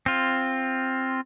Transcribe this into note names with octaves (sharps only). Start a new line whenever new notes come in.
C4 F4